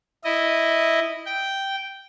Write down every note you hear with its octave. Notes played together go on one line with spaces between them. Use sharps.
E4 D#5
G5